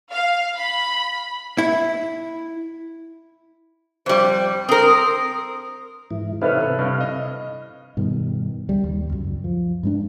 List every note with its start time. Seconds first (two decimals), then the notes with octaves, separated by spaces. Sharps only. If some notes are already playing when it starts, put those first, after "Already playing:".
0.12 F5
0.58 B5
1.58 E4
4.06 F2 G3 C5
4.69 C4 A#4 D#6
6.11 G#2 E3
6.42 C3 C4 D#4 E4 A4 B4 C#5 F5
6.61 C3 A4
6.79 G2 C3 F5
7.01 D#5
7.97 G2 B2 D#3
8.69 C#2 G3
8.84 D#2
9.09 C#2 F#2
9.44 F3
9.83 G2 G#3 D4